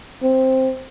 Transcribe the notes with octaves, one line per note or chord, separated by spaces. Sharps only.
C4